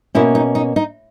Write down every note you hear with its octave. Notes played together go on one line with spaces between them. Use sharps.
B2 A#3 C#4 E4
D#4
D#4
D#4